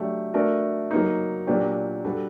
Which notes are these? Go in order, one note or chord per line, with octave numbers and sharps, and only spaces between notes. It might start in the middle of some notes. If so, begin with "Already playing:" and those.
Already playing: F#3 A3 D4 G4
A3 D4 F#4 A#4
F#3 A#3 D#4
A#2 F#3 A#3 D4 G4
G3 D4 F#4 A4